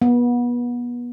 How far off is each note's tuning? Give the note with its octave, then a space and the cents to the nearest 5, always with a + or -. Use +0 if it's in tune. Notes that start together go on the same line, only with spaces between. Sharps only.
B3 -30